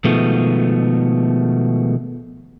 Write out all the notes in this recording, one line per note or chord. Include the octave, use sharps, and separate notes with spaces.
B2 D#3 F3 G#3 A3 B3